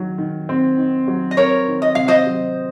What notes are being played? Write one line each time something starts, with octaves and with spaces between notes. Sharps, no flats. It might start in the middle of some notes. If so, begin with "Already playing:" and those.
Already playing: D#3 F#3
D#3
C4
D#3
F#3
D#5
C4 A#4 C#5
D#3
D#5
C3 F5
C5 D#5
F#3